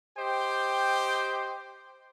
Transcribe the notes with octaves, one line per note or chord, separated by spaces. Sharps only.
G4 C5 D#5 G5